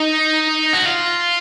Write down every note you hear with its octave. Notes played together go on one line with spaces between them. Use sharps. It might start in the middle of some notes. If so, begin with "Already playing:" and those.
Already playing: D#4
F#4
F4